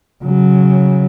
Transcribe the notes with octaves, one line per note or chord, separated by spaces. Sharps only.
C#3 F#3